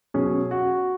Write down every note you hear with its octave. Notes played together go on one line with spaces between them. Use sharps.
B2 F#3 C#4 G#4
F#4